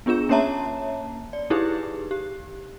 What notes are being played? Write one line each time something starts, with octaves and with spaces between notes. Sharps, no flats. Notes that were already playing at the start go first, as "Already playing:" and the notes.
B3 D4 F4 G#4 E7
A#3 C#4 C#5 E5 A5 A#5
D5
D#4 E4 G4 G#4 B4
G4